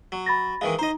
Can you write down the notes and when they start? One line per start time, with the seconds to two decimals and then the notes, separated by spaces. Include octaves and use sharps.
0.12 F#3
0.26 B5 A6 A#6
0.61 D#3 E3 G#3 F5
0.79 D#4 C5 D#5 A#5